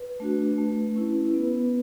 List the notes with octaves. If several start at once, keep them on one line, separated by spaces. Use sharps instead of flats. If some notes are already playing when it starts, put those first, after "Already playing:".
Already playing: B4
A3 D4 F#4
A3
C#4 E4
B3 B4